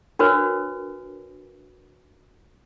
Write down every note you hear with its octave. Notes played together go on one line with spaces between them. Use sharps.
D4 F#4 A#4 B4 C#5